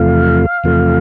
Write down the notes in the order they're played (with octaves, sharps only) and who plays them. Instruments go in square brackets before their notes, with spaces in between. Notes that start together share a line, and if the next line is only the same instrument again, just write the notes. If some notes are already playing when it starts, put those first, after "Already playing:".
Already playing: [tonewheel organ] E2 C3 F3 A3 F5
E2 C3 F3 A3